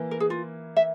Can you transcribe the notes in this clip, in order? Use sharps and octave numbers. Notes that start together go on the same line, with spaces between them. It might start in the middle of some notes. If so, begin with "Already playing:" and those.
Already playing: E3 A#3 E4
A#4
G#4
F4
E5